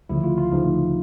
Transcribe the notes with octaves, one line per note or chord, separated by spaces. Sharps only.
D2 C#3 F3 E4
F4
F4
D2 C#3 F3 D#4